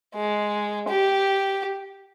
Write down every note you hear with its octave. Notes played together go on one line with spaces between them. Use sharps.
G#3
G4